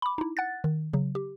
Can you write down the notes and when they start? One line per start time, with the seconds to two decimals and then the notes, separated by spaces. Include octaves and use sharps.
0.02 B5 D6
0.18 D#4 E4
0.37 F#5 F#6 A6
0.64 D#3
0.93 C#3 F#3
1.15 G4